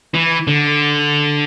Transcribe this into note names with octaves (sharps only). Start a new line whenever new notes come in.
E3
D3